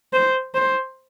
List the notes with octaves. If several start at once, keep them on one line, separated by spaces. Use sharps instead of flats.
C5
C5